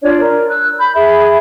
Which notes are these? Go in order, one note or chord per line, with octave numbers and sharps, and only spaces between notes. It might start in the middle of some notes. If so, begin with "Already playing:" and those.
D4 F4 C#5 D5
A#4
E6 F#6
B5 G6
G#4 E5 B5